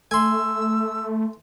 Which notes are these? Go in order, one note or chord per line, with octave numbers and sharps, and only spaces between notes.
A3 G#5 C6 E6